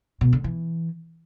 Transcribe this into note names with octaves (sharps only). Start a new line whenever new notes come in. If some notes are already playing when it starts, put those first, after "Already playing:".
B2
D3
E3